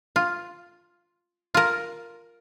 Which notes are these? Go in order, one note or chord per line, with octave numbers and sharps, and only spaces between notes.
F4
F4 A#4